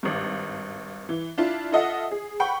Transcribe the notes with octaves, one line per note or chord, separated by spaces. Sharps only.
G#1 G2
E3
D4 E4 F4
F4 A4 D#5 E5 F#5
G#4
F#5 G5 B5 C#6